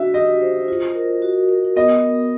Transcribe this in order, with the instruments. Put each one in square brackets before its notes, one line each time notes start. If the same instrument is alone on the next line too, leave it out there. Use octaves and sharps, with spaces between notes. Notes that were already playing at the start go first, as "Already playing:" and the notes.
Already playing: [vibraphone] D4 F#4 [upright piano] E5
[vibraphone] G4 [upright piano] D#5
[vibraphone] C5
F4
A#4
F#4
A#4
[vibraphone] B3 [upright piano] D#5